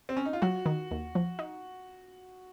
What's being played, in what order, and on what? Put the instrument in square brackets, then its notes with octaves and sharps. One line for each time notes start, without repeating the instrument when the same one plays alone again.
[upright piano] C4
C#4
D#4
F4
[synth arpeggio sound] F#3 [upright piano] F#4
[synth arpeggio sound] D#3
D#2
F3
D#4